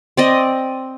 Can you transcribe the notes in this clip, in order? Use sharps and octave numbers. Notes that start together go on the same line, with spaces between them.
C4 D5 D#5